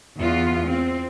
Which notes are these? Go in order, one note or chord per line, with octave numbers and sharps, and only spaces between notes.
E2 B3 F4
C4